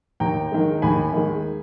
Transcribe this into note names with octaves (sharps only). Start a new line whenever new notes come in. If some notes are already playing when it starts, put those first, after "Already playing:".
D#2 G5 A#5
D#3 G#3
D#2 G#5 B5
D#3 G#3